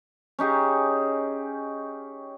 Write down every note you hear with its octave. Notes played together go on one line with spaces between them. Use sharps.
C#4 D#4 G4 G#4